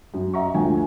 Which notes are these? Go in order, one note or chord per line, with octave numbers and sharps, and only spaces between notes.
F#2
D#5 E5 A#5 C#6
D2 F3 G5 G#5